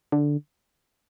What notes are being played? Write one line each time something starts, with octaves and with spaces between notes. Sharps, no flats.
D3